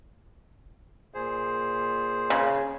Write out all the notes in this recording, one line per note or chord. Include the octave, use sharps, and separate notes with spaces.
A#2 G#4 C5
C#3